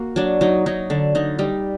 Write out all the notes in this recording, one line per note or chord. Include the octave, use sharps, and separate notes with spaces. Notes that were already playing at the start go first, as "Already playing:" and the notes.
Already playing: A#3 F#4
F#3 D4
F#3 D#4
F#3 D#4
D3 D4
D3 D#4
G3 D#4